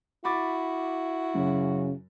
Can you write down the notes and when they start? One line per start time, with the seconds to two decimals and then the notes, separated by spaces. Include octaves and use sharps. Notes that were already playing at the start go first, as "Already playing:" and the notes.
0.25 E4 F#4 B5 D6 A6
1.35 F#2 C#3